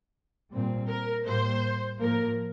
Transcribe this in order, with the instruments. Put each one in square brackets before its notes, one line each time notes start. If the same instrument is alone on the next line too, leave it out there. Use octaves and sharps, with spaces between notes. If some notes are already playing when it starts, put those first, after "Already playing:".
[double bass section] A#2 G3 C4
[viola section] A#4
[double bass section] A2 G3 A#3 [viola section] C5
[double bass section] A2 F3 A#3 [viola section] A#4